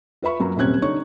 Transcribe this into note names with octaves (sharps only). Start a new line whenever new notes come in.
F4 B4 E5 B5 C#6
F#2 F#3 A#3 A#5
D#1 C3 C4 C#4 F#6 G#6
D3 D#4 C#5 C#6